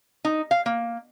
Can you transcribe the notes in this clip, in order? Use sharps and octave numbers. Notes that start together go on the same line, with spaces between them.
D#4
F5
A#3